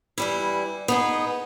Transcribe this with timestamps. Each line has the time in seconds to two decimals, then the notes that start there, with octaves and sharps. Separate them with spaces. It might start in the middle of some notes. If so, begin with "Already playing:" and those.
0.18 E3 G3 E4
0.88 B3 D#4 G#4